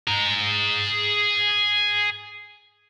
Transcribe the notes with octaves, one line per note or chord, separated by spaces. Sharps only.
G#4 A#5